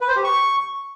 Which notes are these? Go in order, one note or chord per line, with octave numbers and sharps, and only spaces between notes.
B4
C5
G4
C#6